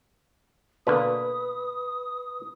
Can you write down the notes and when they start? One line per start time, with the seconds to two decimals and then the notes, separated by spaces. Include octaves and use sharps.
0.87 B2 D3 A#3 B4 B5 D#6